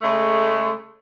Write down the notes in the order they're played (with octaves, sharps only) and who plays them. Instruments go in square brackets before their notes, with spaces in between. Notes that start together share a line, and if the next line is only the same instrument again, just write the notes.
[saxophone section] C#3 G#3 A3